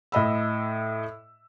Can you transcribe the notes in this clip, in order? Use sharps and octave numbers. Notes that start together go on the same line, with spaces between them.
A2 D#5 B5 E6